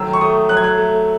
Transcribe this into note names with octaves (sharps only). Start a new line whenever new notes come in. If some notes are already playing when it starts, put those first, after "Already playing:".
Already playing: D#3 F#3 A3 E6
C#6
A3 D#6
F#3 F#6
G#6
F#6
A3